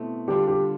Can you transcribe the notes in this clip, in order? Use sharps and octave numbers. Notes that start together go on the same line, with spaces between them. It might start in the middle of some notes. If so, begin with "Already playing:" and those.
Already playing: B2 A3 C4 E4
D3 G3 D4 F4 G4
G4